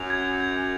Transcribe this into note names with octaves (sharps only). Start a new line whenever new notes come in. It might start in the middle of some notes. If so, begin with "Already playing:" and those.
Already playing: F#2 F7
G#6
G#6